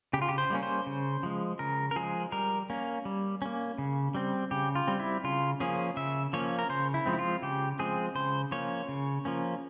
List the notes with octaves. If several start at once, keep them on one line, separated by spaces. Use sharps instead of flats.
C#3 G4
F4
G4
C5
G3 A#3 C#4
C5
C#3
F3 G#3
C#3 A#4
A#4
F3 G#3 G#4
G3 A#4
A#3 C#4
G3
A#3 C#4
C#3
G3 C4
C#3 G4
F4
G3 C4
E4
C#3 F4
F3 A#3 C#4 G#4
C#3 E5
F3 A#3 C#4 C#5
A#4
C#3 C5
E4
F3 G#3 C4
E4
F4
C#3 G4
F3 G#3 C4 G#4
C#3 C5
F3 A#3 C#4 C#5
C#3
F3 A#3 C#4